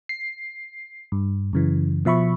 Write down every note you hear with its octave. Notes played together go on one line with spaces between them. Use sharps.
C7
G2
F#2 C#3 E3
B2 F3 E5 B5 C#6